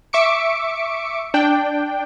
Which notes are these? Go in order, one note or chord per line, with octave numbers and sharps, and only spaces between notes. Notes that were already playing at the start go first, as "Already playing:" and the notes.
E5 C#6 D6 C#7 D7
D4 G5